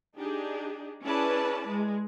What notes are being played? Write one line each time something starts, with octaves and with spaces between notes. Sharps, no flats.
D4 D#4 G4 G#4
C#4 E4 G#4 B4 D5 A5
G#3